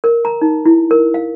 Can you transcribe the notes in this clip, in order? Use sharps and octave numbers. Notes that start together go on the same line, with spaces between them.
A#4
A#5
D#4
E4
A#4
F5